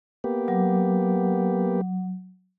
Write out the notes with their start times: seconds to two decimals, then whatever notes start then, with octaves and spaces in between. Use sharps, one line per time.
0.24 A#3 B3 G4
0.48 F#3